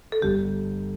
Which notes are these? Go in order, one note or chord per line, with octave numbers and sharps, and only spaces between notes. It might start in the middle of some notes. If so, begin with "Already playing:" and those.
A4
G1 G2 D3 G4